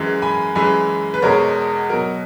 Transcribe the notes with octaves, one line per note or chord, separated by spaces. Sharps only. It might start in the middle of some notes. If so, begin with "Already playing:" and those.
Already playing: F#2 E3 G#3
G#5 B5
F#2 E3 G#3 G#5 B5
B4
E2 B2 G#3 A#4 C#5
B2 F#3 A#4